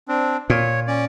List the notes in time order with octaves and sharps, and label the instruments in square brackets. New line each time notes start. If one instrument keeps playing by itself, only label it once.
[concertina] C4 D4
[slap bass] A#2 [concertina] C#5
[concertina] C#4 D5